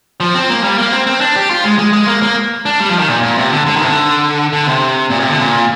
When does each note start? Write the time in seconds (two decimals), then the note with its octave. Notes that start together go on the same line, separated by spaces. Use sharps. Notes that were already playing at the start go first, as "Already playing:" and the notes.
0.20 F3
0.35 C4
0.50 A#3
0.63 G3
0.78 A#3
0.93 C4
1.07 C4
1.21 D4
1.36 G4
1.50 F4
1.65 G#3
1.79 G#3
1.93 G#3
2.08 A#3
2.22 A#3
2.66 D4
2.80 G3
2.89 F3
2.99 D#3
3.08 A#2
3.23 A#2
3.38 C3
3.51 D3
3.66 D3
3.76 D#3
3.81 C3
3.85 D3
4.53 D3
4.67 C3
5.10 A#2
5.20 C3
5.30 D3
5.39 A#2